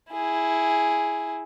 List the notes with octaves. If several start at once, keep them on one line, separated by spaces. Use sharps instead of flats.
E4 G#4